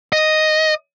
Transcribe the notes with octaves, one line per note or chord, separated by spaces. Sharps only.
D#5